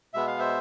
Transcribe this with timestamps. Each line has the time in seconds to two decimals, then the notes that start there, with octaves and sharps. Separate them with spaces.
0.14 B2 G#3 B3 E5
0.27 F5
0.39 C5 E5